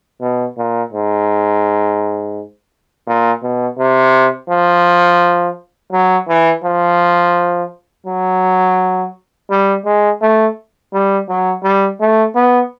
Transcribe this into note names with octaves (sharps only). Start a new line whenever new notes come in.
B2
A#2
G#2
A#2
B2
C3
F3
F#3
E3
F3
F#3
G3
G#3
A3
G3
F#3
G3
A3
B3